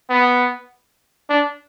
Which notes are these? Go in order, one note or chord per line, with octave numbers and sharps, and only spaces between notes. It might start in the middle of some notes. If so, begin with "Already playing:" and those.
B3
D4